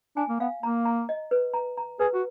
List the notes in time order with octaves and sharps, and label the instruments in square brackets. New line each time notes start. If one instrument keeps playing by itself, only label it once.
[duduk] D4 [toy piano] G#5
[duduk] A#3
[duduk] B3 [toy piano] F5
[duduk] A#3 [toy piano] A#5
[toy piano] A#5
D#5
B4
A#5
A#5
[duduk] G#4 [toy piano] B4
[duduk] F#4